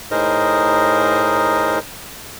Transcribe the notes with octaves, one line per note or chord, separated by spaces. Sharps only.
A2 D#4 G#4 A#4 C5 D#5